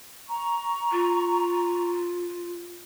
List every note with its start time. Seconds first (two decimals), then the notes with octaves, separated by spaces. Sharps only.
0.28 A#5 C#6
0.91 F4